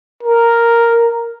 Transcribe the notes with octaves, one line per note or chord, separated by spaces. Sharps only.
A#4